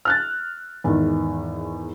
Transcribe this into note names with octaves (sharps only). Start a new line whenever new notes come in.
F6 F#6 A6
E2 G#2 D#3